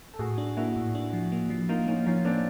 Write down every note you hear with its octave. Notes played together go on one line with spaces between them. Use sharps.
A4
A2 F#4 G#4
D4
A#3 E4 F#4
A2
D4
F3
A#3
F3
A#3 D#4 F4
A#3 C#4 D#4
F3 C#4 D#4
A#3 C4 D4